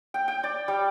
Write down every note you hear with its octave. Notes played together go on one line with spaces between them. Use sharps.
G5
G5
D5
G3